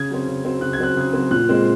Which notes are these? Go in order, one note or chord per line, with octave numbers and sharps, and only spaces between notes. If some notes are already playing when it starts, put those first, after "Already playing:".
Already playing: C#3 G#6
F#3 C4
C#3
F#3 C4
C#3 F#6
G#6
F#3 C4 F#6
C#3
F#3 C4
A#2 F#6
G#3 C4